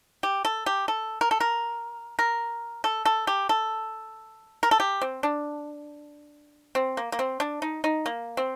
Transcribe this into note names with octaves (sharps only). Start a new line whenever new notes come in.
G4
A4
G4
A4
A#4
A4
A#4
A#4
A4
A4
G4
A4
A#4
A4
G4
C4
D4
C4
A#3
A#3
C4
D4
D#4
D#4
A#3
C4